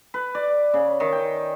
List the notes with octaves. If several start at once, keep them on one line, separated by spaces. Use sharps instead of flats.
B4
D5
C#3
D#3
G5